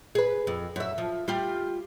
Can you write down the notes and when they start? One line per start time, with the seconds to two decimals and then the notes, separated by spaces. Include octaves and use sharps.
0.15 G#4 B4
0.47 F2
0.76 F#2 E5
0.98 F3
1.28 G3 F4 G4